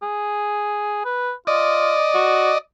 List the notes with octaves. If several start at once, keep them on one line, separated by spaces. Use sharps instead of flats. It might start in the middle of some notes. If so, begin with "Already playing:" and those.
G#4
B4
F4 D5 D#5
F#4